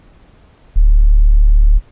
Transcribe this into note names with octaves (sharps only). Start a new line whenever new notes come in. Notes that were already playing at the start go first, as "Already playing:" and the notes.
D1